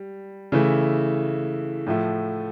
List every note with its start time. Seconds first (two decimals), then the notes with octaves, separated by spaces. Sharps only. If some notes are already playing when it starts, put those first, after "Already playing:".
Already playing: G3
0.52 C#3 E3 A3
1.87 A2 F3 A3